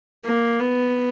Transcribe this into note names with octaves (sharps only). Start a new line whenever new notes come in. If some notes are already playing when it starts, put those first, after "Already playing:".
A#3
B3